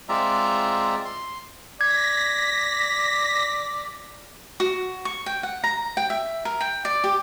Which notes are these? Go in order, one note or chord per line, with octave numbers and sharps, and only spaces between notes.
G#3 C4 F4 D5 E5 A#5
C6
D5 G#6 A#6 B6
F#4
C#6
G5
F#5
A#5
G5
E5
A#4
G5
D5
G4